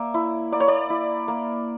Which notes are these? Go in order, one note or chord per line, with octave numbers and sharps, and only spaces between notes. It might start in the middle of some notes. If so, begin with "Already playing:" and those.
Already playing: A#3 D5 E5
E4
A#3 D5
C#5
D5
E4
A#3